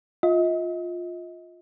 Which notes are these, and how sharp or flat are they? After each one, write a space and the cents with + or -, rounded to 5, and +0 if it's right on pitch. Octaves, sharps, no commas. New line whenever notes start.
F4 +10 D#5 +35